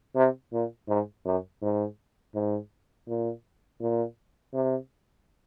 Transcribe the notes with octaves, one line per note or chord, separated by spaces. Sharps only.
C3
A#2
G#2
F#2
G#2
G#2
A#2
A#2
C3